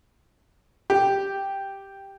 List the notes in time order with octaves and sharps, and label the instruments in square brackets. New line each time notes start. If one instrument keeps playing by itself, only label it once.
[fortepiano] G4